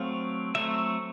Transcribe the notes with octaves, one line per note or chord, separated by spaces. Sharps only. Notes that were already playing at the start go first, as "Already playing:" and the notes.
Already playing: F#3 A3 C4 F5
F#3 A3 C4 E5